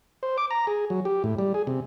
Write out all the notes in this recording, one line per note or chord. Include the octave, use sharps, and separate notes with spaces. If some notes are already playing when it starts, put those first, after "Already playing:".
C5
D6
A#5
G#4
F#3
G4
A2
G3
G#4
C3